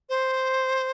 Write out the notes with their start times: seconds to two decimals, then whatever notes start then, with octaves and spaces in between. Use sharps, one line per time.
0.09 C5